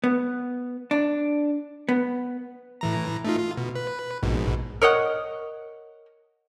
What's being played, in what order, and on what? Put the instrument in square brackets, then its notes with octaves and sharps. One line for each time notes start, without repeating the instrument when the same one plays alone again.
[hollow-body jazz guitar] B3
D4
B3
[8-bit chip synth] A2 E3 A#5
A3 D#4 F4
F4
B2
B4
A#1 G#2 B2
[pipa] A#4 C#5 D#5 F#5